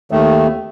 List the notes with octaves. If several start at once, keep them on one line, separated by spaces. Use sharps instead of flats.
D#2 D#3 A3